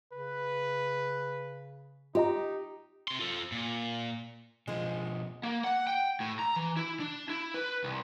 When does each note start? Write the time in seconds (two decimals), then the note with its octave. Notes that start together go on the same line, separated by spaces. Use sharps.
0.13 C#3 B4
2.15 D#4 F4 G4 D#5 A#5
3.08 C3 C6
3.19 F4 A4
3.52 A#2
4.68 B2 F3 G#3 G#4 C5 D#5
5.43 A#3
5.64 F#5
5.87 G5
6.20 A2
6.39 A#5
6.56 E3
6.77 E4
7.00 D4
7.29 E4
7.54 B4
7.84 C2